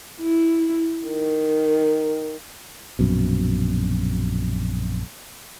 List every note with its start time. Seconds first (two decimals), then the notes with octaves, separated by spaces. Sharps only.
0.21 E4
1.07 D#3
2.99 A#1 F#2 B2